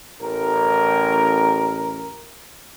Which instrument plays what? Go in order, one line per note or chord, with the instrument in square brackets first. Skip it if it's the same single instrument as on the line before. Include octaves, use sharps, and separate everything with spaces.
[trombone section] A1 A#4